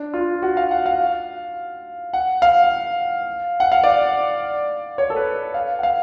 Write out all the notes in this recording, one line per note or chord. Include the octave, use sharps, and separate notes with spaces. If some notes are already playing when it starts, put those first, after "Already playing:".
Already playing: D4
F4
F#4
F5
F#5
F5
F#5
F5
F#5
F5
D5
C#5
A4
B4
F5
F#5
F5